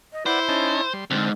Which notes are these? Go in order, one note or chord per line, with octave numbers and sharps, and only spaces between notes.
D#5
E4 B4 C5 D5 F#5
C#4 D#4 A5
G3 C6
C2 G#2 D3 C4 C5 A5